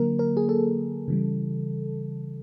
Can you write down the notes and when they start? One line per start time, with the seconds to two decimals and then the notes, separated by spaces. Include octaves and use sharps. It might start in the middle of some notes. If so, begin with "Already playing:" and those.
Already playing: D3 F#3 A#3 A#4
0.19 A#4
0.37 G#4
0.49 A4
1.08 C#3 E3 G3